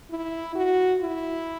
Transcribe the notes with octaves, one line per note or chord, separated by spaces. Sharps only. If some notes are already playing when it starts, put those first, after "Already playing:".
E4
F#4
E4